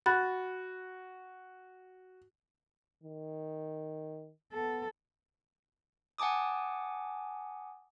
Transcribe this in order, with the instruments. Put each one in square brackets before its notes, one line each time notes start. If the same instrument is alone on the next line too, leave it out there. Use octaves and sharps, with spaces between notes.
[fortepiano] F#4 [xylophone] B5 F#6 A6
[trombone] D#3
[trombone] B3 [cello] A4
[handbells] F#5 G#5 A5 D6 D#6